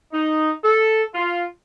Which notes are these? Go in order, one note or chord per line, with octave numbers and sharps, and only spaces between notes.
D#4
A4
F4